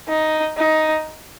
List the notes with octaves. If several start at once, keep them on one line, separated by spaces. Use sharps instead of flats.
D#4
D#4